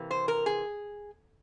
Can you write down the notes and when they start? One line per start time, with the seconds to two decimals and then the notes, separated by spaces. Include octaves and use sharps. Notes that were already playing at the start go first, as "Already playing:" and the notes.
Already playing: C3 E3 A#3
0.11 C5
0.28 A#4
0.46 G#4